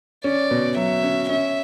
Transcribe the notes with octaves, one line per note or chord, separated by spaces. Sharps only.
C#4 D5
B2
F#3 E5
C#4
C#4 E5